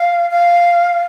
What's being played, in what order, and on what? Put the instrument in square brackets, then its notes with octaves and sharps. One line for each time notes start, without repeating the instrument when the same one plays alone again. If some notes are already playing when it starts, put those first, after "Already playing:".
Already playing: [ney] F5
F5